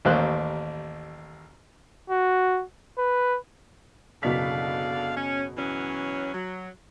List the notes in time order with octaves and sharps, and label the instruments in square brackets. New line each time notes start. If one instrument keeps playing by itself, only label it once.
[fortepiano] A1 D#2 A#3 C5 F#6
[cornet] F#4
B4
[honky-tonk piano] F#1 B2 B6 [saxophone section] D3 D5 F5
[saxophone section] C#4
E3 F#3 C#4
F#3